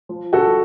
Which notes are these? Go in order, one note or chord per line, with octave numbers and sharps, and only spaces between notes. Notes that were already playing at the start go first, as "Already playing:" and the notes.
F3
D3 F#4 A4